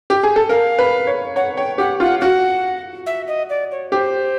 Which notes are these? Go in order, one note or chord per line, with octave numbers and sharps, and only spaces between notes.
G4
G#4
A4
A#4 F5
B4
C#5
C#5 F#5
C#5 G5
G4 F#5
F4 F#5
F#4 F#5
E5
D#5
D5
C#5
G4 C5